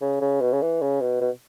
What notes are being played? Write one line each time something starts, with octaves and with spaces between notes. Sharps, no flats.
C#3
C#3
B2
C#3
E3
C#3
B2
B2